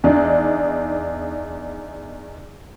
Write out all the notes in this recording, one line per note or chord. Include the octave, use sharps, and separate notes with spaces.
E2 D4 D#4